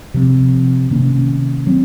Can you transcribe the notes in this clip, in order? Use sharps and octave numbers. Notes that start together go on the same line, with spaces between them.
C3 F3 C4
C3 D#3 A#3 C#4
F#3 C4